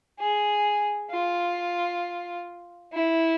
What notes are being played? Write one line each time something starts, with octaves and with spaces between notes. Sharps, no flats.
G#4
F4
E4